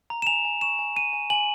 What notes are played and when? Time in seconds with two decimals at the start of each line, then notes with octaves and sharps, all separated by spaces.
0.10 A#5
0.22 E7
0.27 G#5 F7
0.45 G#5
0.61 C#6 E7
0.79 G#5
0.96 G#5 D#7
1.13 G#5
1.30 G#5 F#7